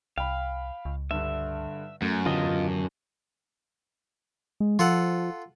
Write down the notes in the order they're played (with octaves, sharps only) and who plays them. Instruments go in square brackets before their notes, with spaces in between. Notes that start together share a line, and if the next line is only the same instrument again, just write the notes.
[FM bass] C2 [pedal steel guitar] F5 [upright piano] G5 B5
[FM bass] C#2
[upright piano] G2 D3 [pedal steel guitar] E5
[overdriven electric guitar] F#2 [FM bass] A3
[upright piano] D#1 E2 G7 [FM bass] D3 [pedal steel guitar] F4 D#5
[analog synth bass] G#3
[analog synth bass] F3 [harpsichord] F4 A4 F#5